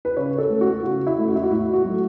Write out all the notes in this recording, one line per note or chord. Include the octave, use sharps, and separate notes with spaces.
B4
C#3 C#5
A4
A3 C#4
F#4
C#3 F#4
E4
A3 C#4
F#4
E4
F#4
A2 E4
F#4
F#3 A3